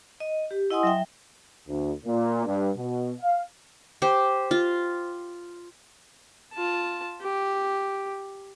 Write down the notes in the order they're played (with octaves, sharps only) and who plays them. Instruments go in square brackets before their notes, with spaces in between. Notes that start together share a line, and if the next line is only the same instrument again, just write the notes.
[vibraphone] D#5
G4
E4 D#5 F#5 G#5 C6 D#6
F#3 E5 G5
[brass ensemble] D2
A#2
G2
B2
F5
[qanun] G4 C5
F4
[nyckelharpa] F4 A5
G4